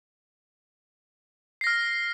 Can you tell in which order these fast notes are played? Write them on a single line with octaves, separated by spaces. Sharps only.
C7 A#6 F6